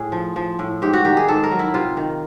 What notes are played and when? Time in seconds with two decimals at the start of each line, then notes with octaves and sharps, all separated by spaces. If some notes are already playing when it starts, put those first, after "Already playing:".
Already playing: A2 G#4
0.12 F3
0.36 F3
0.59 A2
0.82 G#2 G4
0.93 F#4
1.05 D#3 G4
1.17 G#4
1.28 G#2 A4
1.43 A#4
1.51 F#3
1.59 E4
1.74 C3 F4
1.97 D#3